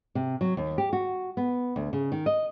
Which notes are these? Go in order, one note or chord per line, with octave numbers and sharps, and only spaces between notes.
C3
F#3
D#2
G4
F#4
B3
D2
C#3
D#3
D#5